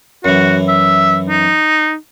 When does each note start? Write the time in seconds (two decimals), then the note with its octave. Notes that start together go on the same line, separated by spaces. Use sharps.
0.25 F#2 E3 F#4
0.68 E5
1.29 D#4